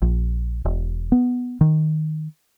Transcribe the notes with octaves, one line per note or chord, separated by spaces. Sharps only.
A#1
E1
B3
D#3